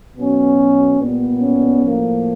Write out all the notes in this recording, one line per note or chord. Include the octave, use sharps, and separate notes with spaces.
B2 F#3 B3 C#4
A#2 G3 B3
C#4
A2 F3 A#3